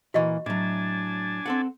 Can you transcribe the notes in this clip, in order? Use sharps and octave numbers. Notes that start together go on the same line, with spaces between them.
A#2 E3 A#3 F#4 D#5 C#6
A2 F#3 D4 G#5 A5
C4 A4 F#5